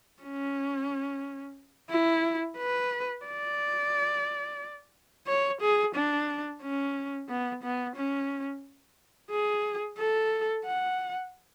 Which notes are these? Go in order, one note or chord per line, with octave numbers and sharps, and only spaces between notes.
C#4
E4
B4
D5
C#5
G#4
D4
C#4
B3
B3
C#4
G#4
A4
F#5